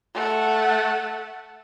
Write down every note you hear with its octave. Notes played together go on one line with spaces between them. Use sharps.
A3 F#5